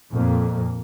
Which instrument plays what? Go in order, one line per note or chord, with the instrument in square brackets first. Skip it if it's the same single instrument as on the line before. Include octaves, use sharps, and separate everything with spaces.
[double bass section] F2 A#2 A#3